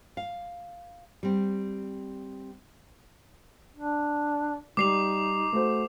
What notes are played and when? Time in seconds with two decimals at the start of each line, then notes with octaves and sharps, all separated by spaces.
0.17 F5
1.23 G3 C4
3.77 D4
4.77 G3 D#4 D6 C7 F7
5.53 A3 F#4 C5